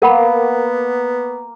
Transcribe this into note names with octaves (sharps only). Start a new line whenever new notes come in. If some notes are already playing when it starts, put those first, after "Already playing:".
A#3 B3 A#4 F#5 B5